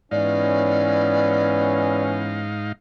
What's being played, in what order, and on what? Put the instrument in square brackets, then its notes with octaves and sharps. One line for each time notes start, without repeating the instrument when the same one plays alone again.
[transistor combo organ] G#2 D#4 F5 [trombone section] E3 B3 C#4 [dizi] D5